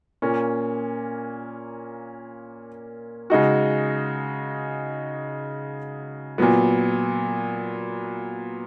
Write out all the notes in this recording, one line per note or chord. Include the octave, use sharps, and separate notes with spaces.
A#2 A#3 C#4
C#3 G#3 D#4 F#4
A#2 F#3 B3